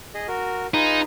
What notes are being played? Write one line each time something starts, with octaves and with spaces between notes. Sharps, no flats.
G#4 D#5
F#4 A#4
D#4 F4 G#4 B4